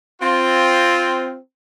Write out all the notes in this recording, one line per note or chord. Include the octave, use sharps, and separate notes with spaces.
C4 F4